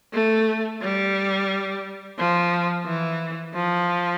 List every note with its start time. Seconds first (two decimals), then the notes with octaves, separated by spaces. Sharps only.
0.13 A3
0.82 G3
2.18 F3
2.86 E3
3.54 F3